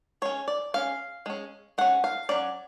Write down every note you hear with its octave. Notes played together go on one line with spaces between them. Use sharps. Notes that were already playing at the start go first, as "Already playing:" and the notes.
G#3 C#4 C#5
D5
G#3 C#4 F5
G#3 C#4
G#3 C#4 F#5
F5
F#3 C#4 D5